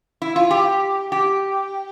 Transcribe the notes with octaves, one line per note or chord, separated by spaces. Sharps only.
E4
F4
G4
G4